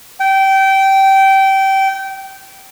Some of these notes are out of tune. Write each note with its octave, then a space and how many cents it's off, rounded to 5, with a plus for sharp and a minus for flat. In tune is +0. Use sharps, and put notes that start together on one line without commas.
G5 -20